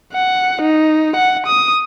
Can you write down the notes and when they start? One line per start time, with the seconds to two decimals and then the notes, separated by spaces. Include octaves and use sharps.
0.13 F#5
0.62 D#4
1.16 F#5
1.47 D#6